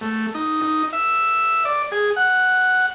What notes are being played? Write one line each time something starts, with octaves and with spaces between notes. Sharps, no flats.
A3
D#4
D#4
E5
D5
G#4
F#5